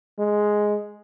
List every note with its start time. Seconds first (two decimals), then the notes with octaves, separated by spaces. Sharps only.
0.19 G#3